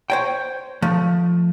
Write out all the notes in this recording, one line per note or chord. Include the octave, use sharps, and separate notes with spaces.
C5 C#5 G5
F3 A3